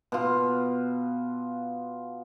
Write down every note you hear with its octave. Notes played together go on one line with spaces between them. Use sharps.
B2 F4